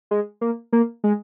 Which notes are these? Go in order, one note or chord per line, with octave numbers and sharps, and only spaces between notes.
G#3
A#3
A#3
G#3